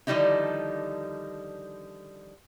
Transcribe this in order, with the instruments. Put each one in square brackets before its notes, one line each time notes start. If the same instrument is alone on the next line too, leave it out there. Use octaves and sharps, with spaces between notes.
[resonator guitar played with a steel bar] D3 D#3 F3 G3 D#4 E4